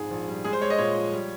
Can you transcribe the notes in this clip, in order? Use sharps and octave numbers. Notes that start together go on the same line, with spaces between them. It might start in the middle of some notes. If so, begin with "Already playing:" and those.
Already playing: A#1 F2 G#2 G#4
A#1
G3
G#3 G#4
C5
G#3 C#5
D#5
A#2 C#5
F3
G3